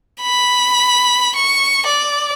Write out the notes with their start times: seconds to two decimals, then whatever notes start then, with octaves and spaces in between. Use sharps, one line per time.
0.21 B5
1.36 C#6
1.87 D5